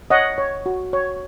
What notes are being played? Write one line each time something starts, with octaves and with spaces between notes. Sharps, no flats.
C#5 D#5 F#5
C#5
F#4
C#5